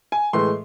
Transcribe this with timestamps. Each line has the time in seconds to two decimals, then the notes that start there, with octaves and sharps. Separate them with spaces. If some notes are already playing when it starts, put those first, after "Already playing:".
0.12 G#5
0.33 A2 E3 G#3 C6